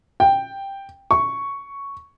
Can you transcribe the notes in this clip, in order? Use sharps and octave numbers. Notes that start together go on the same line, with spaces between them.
G5
C#6